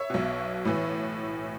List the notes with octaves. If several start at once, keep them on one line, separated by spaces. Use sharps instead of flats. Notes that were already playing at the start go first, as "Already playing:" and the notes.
Already playing: C#5 E5
B1 B2
A2 E3